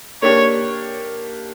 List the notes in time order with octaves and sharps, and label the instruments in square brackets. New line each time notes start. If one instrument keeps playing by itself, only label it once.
[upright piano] A#3 D4 G4 [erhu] C#5